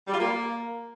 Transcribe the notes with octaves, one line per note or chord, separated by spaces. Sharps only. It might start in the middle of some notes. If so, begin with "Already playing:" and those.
G3
F4
A#3